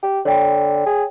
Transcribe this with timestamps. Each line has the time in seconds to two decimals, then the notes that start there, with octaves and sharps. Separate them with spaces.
0.03 G4
0.25 D3 C#5 G5
0.86 G#4